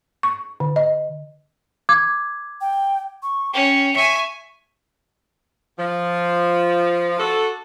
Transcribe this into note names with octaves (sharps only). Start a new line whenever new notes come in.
C#6
D3
D#5
D6 G#6
G5
C#6
C#4 G5
E5 G#5 C#6 C#7
F3
D4 F#4 A4